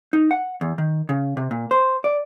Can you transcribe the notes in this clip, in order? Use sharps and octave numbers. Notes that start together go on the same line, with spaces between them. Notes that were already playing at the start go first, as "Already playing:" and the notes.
D#4
F#5
E2
D#3
C#3
C3
A#2
C5
D5